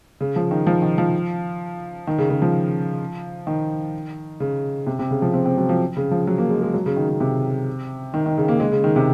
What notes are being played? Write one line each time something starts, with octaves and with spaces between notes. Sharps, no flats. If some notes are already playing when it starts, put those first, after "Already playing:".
C#3
F3
D#3
F3
D#3
F3
D#3
C#3
C#3
F3
D#3
C#3
C3
C3
C#3
F3
C4
C4
F#3
F3
C#3
F3
F#3
A#3
G#3
G#3
F#3
C#3
D#3
C#3
C3
D#3
D#3
C#3
A#3
G#3
C#3
D#3
C3